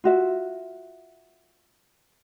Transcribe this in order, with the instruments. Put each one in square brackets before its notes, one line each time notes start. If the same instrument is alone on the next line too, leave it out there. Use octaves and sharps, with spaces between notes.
[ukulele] F4 F#4 E5